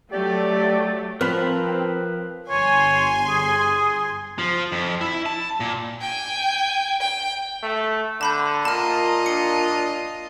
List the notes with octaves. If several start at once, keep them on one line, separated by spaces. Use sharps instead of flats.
F#3 A3 G4 D5
F3 C4 A#4 B4 B5
G1 C#5 G#5 C6
G#4
F3
F2
E4
A5
A#2
G5 G#5
G5
A3
D3 A5 B5 G6
A#2 F4 A#4 D#5 A5 F6
D4 C#7